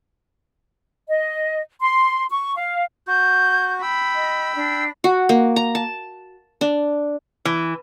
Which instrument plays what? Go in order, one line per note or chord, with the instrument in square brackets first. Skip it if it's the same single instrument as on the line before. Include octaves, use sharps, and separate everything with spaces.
[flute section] D#5
C6
C#6
F5
[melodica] F#4 [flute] G6
[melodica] G5 E6 [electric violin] B5
[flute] D#5
D4
[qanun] F#4
A#3
A#5
A5
D4
[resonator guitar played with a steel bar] E3